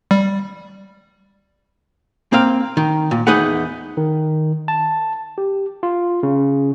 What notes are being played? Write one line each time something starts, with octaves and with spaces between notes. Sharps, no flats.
G3
A#3 C4 F5
D#3
A#2
E2 D#4 G#4 B4 F#5
D#3
A5
G4
F4
C#3